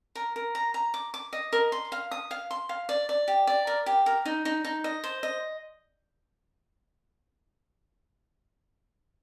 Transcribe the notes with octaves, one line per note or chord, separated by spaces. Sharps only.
A#4
A#4
A#5
A#5
D6
D6
D#5
A#4
C6
F5
D#6
F5
C6
F5
D5
D5
G4
D5
A#4
G4
A#4
D#4
D#4
D#4
D#5
C5
D#5